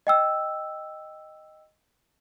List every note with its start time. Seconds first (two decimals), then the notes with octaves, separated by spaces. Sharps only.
0.07 D#5 G5 E6